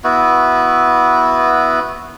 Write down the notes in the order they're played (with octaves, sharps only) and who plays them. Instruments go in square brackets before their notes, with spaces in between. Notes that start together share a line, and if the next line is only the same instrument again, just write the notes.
[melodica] B3 E4 F#4